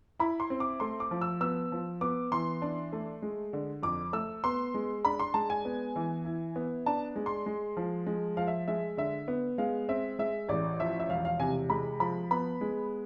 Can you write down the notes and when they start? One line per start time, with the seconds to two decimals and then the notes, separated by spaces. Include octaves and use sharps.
0.19 E4 B5
0.40 C6
0.50 C4
0.60 D6
0.80 A3 C6
1.00 D6
1.11 F3
1.21 E6
1.41 B3 E6
1.72 F3
2.01 B3 D6
2.31 E3 C6
2.62 D4
2.93 A3
3.22 G#3
3.53 D3
3.83 F2 D6
4.13 A3 E6
4.44 B3 C6
4.74 G#3
5.05 D4 B5
5.19 C6
5.34 G#3 A5
5.50 G#5
5.65 B3
5.96 E3
6.25 E4
6.56 B3
6.86 D4 A5
7.16 G#3
7.26 C6
7.46 G#3
7.77 F3
8.06 G#3
8.37 F3 F5
8.47 E5
8.68 G#3 E5
8.97 D3 E5
9.28 B3
9.58 G#3 F5
9.89 C4 E5
10.19 G#3 E5
10.49 A1 D5
10.80 F3 E5
11.00 E5
11.09 E1 F5
11.25 F5
11.39 C3 G#5
11.70 G#3 B5
12.00 F3 B5
12.31 B3 B5
12.61 G#3